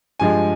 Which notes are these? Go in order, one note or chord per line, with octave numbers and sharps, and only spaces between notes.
G2 F3 G#3 G#5